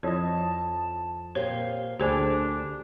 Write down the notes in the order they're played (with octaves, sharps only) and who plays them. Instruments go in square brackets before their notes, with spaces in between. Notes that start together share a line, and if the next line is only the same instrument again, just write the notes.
[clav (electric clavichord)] F2 D#5 [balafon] F3 E4 C#5 [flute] A5
[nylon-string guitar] A#2 G4 C5 [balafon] C#5 [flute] F5
[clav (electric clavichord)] D2 [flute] D4 [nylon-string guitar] G4 [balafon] G#4 C5 G#5